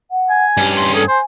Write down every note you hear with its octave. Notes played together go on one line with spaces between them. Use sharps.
F#5
G#5
G2 C#4 G4
C6
G#4 A4
C5 G#5